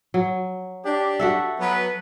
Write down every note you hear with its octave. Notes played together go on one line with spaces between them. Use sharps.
F#3
D4 G4
F#4 A4 E5
F#3 B3 B4